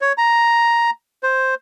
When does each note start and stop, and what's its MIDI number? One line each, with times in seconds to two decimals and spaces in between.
0.01 0.13 73
0.18 0.90 82
1.23 1.55 72